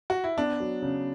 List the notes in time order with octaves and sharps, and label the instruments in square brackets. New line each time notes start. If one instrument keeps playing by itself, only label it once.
[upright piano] F#4
E4
[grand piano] B3 [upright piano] D4
[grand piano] F#3
C#3